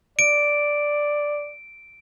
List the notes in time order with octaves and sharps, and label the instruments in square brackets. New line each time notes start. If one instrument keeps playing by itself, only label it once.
[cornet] D5 [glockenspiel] D7